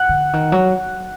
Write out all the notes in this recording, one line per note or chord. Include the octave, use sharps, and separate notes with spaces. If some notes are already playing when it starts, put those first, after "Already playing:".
Already playing: F#5
D3
D#3
F#3